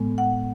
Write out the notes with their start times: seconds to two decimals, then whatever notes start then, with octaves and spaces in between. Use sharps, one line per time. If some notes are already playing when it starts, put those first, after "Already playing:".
Already playing: A2 G#3 B3
0.18 F#5